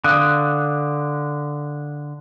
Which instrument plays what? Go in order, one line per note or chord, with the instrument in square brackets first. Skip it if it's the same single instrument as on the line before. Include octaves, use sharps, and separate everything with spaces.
[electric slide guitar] D3 [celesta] F5 D#6 F#6